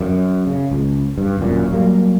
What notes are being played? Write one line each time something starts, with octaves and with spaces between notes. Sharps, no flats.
F#2
C#3
C#2
G2
D#1 C2 F#2 A#2
F#3 G3 A#3